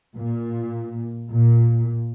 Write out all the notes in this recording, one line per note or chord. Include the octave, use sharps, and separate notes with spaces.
A#2
A#2